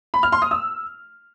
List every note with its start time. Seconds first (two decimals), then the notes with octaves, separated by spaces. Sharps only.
0.14 B5
0.23 F6
0.32 C6
0.42 D#6
0.51 E6